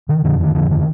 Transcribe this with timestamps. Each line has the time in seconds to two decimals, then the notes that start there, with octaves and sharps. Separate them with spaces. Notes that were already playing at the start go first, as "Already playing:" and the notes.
0.09 D3 D#3
0.24 F2 D3 F3
0.40 D3 D#3
0.55 F2 D3 F3
0.71 D3 D#3